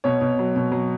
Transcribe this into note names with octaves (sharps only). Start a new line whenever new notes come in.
B2 C#5
B2
F#3
B2
F#3